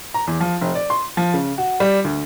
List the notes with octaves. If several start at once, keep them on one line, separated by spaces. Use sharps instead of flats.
A#5
E2
F3
F1
D5
C6
F3
C#3
F#4
G3
D2